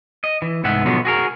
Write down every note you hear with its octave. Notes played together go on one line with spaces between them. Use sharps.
D#5
E3
C2 G#2 B3 E5 F#5
B2 D3 F3 F#3 B3
F#4 G#4 A#4